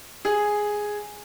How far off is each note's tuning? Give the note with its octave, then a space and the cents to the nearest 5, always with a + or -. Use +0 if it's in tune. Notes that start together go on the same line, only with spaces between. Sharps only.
G#4 +0